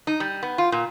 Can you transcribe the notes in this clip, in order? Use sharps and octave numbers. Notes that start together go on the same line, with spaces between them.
D#4
G3
B3
F4
A#2